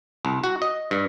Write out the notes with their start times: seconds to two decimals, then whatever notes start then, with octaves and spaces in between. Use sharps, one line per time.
0.25 C2
0.44 F#4
0.62 D#5
0.91 G2